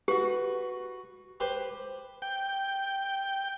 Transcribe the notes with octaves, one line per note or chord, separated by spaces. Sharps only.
F#4 G4 B4
G4 B4 C5
G5